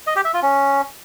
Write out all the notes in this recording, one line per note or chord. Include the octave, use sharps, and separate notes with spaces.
D#5
G4
E5
F4
C#4